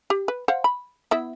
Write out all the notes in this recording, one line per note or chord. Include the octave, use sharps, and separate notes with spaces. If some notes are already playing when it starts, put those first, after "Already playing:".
G4
B4
C5 F5 F#5
B5
B3 E4 E5